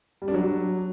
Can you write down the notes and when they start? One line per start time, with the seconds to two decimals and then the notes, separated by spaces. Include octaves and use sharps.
0.22 G3
0.28 D4
0.34 F#3